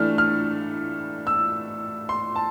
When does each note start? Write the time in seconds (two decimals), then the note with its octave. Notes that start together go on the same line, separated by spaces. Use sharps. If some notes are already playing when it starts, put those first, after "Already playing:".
Already playing: E3 A3 D4 F6
0.18 F6
1.27 E6
2.09 C6
2.36 A5